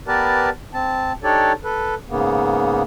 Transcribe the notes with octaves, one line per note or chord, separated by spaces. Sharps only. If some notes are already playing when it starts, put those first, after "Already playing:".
B3 G4 A#4 B4 D5 A5
C4 A5
D4 D#4 G4 A4 C#5 D5
A4 B4
G#2 C#3 A#3 B3